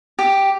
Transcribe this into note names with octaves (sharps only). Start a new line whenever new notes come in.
G4